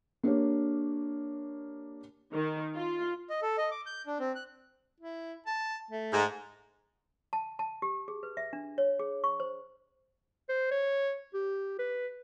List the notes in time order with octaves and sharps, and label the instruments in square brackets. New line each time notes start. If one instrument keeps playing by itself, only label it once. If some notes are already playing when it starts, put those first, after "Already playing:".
[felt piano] A#3 D4 G4 C#5
[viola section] D#3
F4
[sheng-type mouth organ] D#5
A4
D#5
D6
G6
D4
C4
F#6
[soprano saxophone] E4
A5
A3
[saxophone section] G#2
[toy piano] A5
A5
G4
G#4
B4
E5
D4
C#5
G#4
C#6
C5
[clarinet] C5
C#5
G4
B4